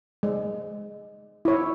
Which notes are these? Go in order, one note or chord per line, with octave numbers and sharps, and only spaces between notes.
G#3
E4 C#5